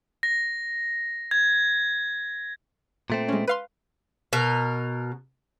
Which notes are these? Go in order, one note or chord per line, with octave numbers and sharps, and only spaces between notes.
A#6
G#6
A#2 A3 C4
G#3 C#4
B4 F5 C6
B2 A#4